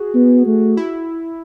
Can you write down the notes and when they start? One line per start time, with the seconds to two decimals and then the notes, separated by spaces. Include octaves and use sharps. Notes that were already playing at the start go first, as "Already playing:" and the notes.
Already playing: F#4 G#4
0.15 B3
0.47 A3
0.77 E4